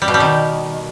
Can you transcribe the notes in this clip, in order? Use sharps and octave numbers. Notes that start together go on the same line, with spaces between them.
G3
B2
G3
D#3